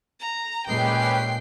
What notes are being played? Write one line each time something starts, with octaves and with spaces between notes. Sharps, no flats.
A#5
A#2 G#3 C#4 G4 B4 G5 C7